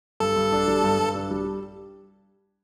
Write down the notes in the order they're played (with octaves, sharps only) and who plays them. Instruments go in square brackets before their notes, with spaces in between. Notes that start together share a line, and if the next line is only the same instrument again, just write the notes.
[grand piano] G2 [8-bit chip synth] A4
[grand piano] G2
D4
G3
G2
G2
D4
G3